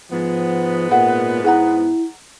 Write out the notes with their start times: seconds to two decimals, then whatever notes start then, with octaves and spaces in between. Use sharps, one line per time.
0.11 G#2 F3 B3
0.91 A#2 G#4 E5 F#5
1.44 E4 G#4 F#5 A#5